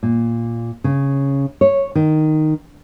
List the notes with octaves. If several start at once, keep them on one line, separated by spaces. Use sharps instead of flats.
A#2
C#3
C#5
D#3